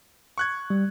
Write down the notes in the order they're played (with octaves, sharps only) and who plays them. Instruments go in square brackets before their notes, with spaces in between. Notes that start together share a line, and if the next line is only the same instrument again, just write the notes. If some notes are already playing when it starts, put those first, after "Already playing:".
[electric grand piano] C#6 F#6 G#6
[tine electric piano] G3